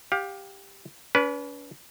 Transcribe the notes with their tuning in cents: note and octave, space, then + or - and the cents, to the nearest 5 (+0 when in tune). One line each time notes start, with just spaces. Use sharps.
G4 +5 F5 +35
C#4 +45 B4 -15